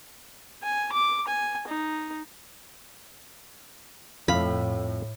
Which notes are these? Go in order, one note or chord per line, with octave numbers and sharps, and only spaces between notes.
G#5
D6
G#5
D#4
F2 A2 F5 B5